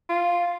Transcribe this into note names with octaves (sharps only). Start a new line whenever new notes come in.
F4